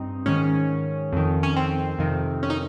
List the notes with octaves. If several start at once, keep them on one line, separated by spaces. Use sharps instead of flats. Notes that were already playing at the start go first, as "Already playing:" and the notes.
Already playing: G2 C4 D#4
G#2 D#3 C#4
F2 D#3
C#4
C4
F2 C3 D#3
C#4
D#4